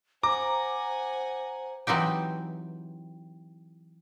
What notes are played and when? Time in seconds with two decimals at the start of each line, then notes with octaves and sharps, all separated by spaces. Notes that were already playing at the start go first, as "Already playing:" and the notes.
0.23 C5 F#5 G#5 A#5 D6
1.87 E3 F#3 C4 D#4 G4